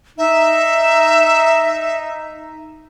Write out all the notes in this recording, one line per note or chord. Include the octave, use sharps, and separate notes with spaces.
D#4 E5